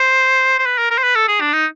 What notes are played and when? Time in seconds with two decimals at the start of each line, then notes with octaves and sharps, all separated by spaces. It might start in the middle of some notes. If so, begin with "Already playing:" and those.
Already playing: C5
0.59 C5
0.66 B4
0.78 A#4
0.91 A#4
0.98 C5
1.03 B4
1.15 A4
1.28 G#4
1.41 D4
1.53 D#4